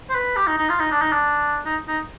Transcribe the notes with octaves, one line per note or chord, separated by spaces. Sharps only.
C5
B4
G4
D#4
D#4
F4
D#4
D4
D#4
D4
D#4
D#4